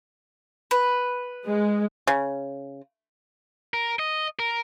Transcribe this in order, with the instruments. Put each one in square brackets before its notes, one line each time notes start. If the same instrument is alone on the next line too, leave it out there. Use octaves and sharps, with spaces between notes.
[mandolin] B4
[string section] G#3
[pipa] C#3
[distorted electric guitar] A#4
D#5
A#4